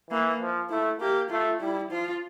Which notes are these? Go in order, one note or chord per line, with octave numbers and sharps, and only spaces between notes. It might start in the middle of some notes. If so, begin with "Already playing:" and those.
E3 A#3
F3
A3 E4
A#3 G4
A3 F4
G3 E4
F3 F4